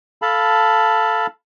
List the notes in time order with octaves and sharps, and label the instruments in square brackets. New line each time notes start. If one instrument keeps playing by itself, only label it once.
[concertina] A4 F5 A5 B5